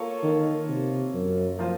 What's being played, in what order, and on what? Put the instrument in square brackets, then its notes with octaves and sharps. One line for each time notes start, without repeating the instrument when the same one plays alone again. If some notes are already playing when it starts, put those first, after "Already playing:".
Already playing: [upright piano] A#3 F4 A4 C#5
[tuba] D#3
C3
F#2
[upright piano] F3 A#3 F4 C5